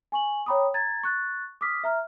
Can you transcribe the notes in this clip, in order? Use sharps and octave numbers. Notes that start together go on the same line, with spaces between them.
G#5 C#6 F#7
C#5 G5 A#5 B5 D6 D#6
A#5 G#6 A6
C#6 F#6 A6
D6 D#6 F6 B6
E5 A#5 F6